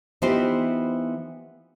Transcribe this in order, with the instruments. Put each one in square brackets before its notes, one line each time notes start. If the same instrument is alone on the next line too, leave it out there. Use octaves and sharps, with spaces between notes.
[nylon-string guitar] E3 B3 D#4 F4 G4 C5